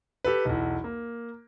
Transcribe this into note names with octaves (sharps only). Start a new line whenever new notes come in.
G4 A4 B4
B1 E2
A#3